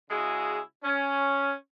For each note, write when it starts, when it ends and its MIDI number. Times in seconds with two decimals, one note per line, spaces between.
0.11 0.60 49
0.11 0.60 56
0.11 0.60 64
0.11 0.60 66
0.11 0.60 68
0.84 1.54 61